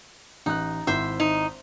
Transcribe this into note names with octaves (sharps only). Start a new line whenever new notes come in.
A1 D#4 F#6
G#1 E4 C5 E5
D#4